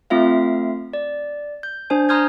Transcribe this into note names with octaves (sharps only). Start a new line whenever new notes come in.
A3 C4 F4 E5 F5
D5
G6
D4 C5 G#5
A#5 C6 D#6 F6 G6 G#6